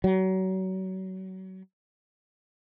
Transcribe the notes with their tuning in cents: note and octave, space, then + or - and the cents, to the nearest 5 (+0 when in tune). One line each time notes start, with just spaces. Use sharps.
F#3 +30